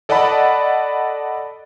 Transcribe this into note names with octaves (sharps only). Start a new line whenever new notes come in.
A4 D5 D#5 F#5 A5 B5